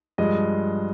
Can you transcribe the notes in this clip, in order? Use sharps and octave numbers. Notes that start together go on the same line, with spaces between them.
G2 F3 G#3 D#5